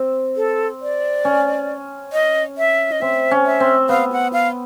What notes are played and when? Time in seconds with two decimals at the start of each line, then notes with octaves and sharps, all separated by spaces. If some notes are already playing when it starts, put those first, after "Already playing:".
Already playing: C4
0.37 A4
0.82 D5
1.25 C#4
2.13 D#5
2.58 E5
2.92 D#5
3.01 C4 E5
3.31 C#4
3.45 E5
3.60 C4
3.89 B3 F5
4.12 F#5
4.33 F5